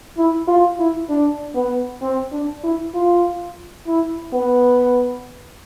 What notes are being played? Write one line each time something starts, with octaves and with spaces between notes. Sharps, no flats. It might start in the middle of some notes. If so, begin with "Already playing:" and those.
E4
F4
E4
D4
B3
C4
D4
E4
F4
E4
B3